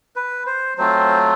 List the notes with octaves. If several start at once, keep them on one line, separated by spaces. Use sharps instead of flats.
B4
C5
F#3 A3 C4 F4 C5